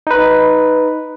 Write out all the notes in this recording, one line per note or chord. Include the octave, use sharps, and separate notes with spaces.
D#4 B4